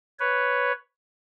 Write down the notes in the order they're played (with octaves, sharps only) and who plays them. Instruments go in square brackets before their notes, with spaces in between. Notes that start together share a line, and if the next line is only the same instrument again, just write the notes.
[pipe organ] B4 C#5